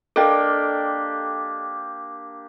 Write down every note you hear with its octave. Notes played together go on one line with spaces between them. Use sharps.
A#3 D4 G4 A4 D#5 G5